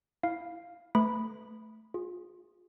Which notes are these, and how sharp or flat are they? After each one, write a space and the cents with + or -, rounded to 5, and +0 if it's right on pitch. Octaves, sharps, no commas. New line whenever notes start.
E4 +0 F5 +0
A3 +0 B4 +20 B5 +0
F4 +35 G#4 -15